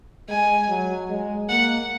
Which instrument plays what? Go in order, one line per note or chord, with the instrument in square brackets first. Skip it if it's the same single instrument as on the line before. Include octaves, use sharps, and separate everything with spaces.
[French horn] G#3 [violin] G#5
[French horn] F#3
G#3
[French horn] A#3 [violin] F#5